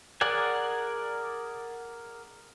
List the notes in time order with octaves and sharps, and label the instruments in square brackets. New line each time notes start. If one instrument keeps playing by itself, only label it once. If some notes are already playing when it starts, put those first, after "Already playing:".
[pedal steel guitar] G#4 A#4 D5 F#5 G#5